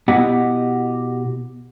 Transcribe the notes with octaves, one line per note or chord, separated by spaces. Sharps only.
B2 B3 E4 G4 D#5 F#5